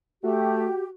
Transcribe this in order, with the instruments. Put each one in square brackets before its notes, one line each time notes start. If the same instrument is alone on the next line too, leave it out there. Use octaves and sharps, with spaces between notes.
[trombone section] A3 [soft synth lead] F#4 [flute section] G4